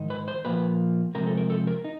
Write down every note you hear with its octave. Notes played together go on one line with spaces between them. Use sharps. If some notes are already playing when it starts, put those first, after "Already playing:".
Already playing: G#2 D#3 D#4
B4
C5
A#2 F3 A#3 B4
C3 F3 G#3 C4 A#4
A4
A#4
A4
A#4
D#4